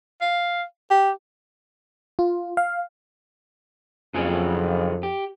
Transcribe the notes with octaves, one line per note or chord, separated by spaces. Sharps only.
F5
G4
F4
F5
F2 C#3 F#3 G#4
G4